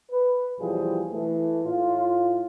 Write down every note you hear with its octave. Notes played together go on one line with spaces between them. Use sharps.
B4
B1 E3 F3 G3 G#4 C5
E3 A3
A2 F4